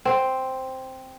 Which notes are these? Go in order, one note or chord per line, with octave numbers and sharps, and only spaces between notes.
C4